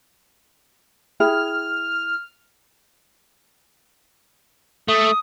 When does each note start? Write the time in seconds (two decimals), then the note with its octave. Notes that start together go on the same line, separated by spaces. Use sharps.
1.20 E4 G#4 G5 F6
4.89 A3 D#6